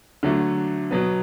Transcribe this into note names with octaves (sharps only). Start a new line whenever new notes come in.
D3 F#3 A3
B2 F#3 B3